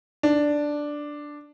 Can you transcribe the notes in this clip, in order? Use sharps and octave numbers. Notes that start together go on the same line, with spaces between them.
D4